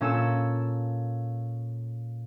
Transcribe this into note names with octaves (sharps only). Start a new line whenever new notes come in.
A#2 C#4 A4 E6 E7